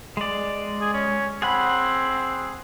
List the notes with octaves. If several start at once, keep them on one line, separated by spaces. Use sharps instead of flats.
G#3 D5
G#4
C#4
C4 G#4 F#5 B5